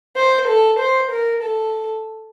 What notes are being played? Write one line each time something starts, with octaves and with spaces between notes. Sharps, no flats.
C5
A4
C5
A#4
A4